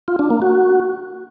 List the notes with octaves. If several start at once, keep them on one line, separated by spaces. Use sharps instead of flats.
F4
D4
A#3
F#4